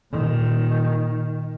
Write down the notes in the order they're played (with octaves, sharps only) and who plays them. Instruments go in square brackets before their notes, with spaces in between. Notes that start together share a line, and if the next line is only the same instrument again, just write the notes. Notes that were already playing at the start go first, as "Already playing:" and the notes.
[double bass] A#2 D#3